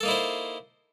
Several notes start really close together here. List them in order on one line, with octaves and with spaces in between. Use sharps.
A4 A#3 D#4 E4 C5